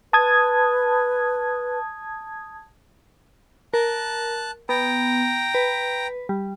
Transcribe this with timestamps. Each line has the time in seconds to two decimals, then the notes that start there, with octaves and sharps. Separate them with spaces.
0.13 B4 A5 D#6 G#6
3.74 A#4 A5 F#6
4.69 B3 G5 A#5
5.55 B4
6.29 G3